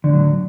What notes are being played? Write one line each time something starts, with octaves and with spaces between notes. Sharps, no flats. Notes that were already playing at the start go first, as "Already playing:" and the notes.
A2 D3 F#3